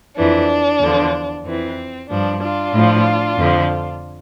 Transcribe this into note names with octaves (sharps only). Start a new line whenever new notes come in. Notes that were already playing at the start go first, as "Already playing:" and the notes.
F2 E3 D4
E2 D3 F3
F2 E3 C4
G2 F3 D4
D4 F4
A2 F3
F2 D3 F3